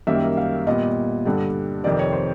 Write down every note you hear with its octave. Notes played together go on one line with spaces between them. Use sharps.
F#2 D#3 G3 A#3 E5
F5
A#2 G3 B3 D#5
G2 D3 G3
F2 C3 D#3 D5
C#5
C5